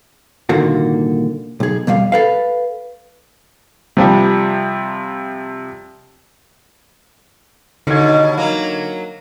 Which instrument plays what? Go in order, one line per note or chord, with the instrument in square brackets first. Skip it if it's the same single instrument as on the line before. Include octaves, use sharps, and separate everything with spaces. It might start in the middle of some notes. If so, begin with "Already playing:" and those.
[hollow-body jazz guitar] C2 A#2 D3 D#3 A#3 F#4
B1 G#4
F2 B2 G3 F5
A4 B4 F5
[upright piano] C3 F3 G3
[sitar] D#2 B2 [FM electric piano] D3 G#6
[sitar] F#3 A#3